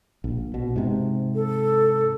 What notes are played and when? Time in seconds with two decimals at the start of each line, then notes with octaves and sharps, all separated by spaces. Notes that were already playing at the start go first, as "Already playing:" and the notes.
0.24 A#1
0.54 B2
0.76 G#2 C3
1.35 A4